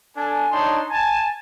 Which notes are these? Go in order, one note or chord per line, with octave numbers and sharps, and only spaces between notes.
D4 A4 G#5
D4 D#4 C#5 A5 C6
G#5 A5